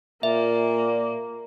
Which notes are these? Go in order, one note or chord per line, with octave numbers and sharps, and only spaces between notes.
A#2 A#3 E5